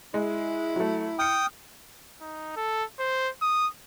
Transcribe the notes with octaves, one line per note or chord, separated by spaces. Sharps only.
G#3 E4
F#3 A3
G5 D#6 F6 C#7
D#4
A4
C5
D#6